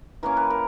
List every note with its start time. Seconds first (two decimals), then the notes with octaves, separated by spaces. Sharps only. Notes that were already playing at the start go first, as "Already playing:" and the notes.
0.23 E3 A#3 C#4 A#4
0.37 B4
0.50 A#4